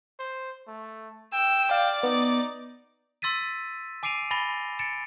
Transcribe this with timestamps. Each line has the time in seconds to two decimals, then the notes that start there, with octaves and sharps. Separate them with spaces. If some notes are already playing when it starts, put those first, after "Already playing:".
0.19 C5
0.67 A3
1.33 G5 E6
1.71 D5 F5
2.03 B3 D#4
3.22 C6 E6 A6 B6 D#7
4.03 G#5 D6 C7 D7 D#7 F7
4.31 G#5 B5 A6 A#6 F7 G7
4.79 A6 C#7 D7 E7